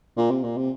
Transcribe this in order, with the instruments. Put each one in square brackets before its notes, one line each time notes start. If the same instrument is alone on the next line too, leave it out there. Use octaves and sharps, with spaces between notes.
[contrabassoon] A#2
C3
A#2
C3